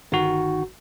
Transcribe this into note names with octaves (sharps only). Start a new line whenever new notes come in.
G1 D#3 F#4